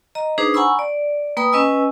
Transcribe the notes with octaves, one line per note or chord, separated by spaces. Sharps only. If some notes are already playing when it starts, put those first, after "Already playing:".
D#5 A#5
D4 D#4 G#4 B4 C5
F#5 G#5 A#5 B5 C#6 E6
D5
A#3 B4 G5 B5 D#6
C#4 B4 D#5 G#5 E6